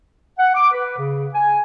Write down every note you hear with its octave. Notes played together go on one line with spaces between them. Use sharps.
F#5
D6
B4
C#3
G#5